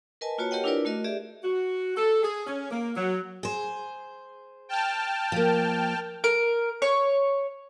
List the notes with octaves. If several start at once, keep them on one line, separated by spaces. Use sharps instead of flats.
A#4 B4 D#5 G#5 A5
A#3 F4 F#4 B4 C#5 A5
G4 A#4 C#5 D#5 F#5 G5
D4 E4 F4 A#4 B4 D5
A3 F#4 A#4 D#5
G4 G#4 D5 E5
F#4
A4
G#4
C#4
A#3
F#3
G#4 C5
G5 A5 F6
F3 A#3
A#4
C#5